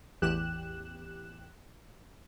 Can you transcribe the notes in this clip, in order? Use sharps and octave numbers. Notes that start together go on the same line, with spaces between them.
A1 E2 G4 F#6 E7